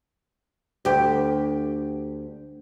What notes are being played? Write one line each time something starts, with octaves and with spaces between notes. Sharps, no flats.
D2 G4